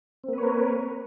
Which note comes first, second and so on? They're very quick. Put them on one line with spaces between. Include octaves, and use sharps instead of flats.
C4 A#3 B4 C#5 A#4